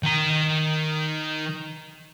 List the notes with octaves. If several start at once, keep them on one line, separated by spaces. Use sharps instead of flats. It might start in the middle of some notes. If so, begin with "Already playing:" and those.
D#3 A#5